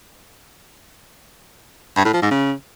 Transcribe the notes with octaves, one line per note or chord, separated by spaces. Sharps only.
G2
A2
F3
G#2
C#3